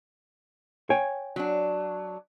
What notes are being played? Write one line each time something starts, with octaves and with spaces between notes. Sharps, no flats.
C#5 G5 G#5
F#3 D4